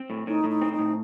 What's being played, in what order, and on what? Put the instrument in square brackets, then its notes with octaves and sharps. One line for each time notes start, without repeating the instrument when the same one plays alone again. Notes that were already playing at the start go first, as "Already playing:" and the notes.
Already playing: [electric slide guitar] C4
A2
[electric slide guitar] A2 [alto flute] D#4
[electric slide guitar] A2
[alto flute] D#4
[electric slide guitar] C4
[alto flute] D#4
[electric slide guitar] A2